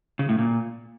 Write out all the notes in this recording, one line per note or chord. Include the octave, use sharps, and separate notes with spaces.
C#3
A2
A#2